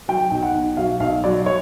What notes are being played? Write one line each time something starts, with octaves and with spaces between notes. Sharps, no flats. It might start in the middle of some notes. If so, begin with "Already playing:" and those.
F#3 G5
B1
F#5
B1
F#3 F5
B1 F5
F#3 D5
C#5